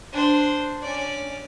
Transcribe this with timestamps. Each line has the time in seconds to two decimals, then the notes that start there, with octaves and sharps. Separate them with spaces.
0.13 D4 C5
0.82 C#4 D5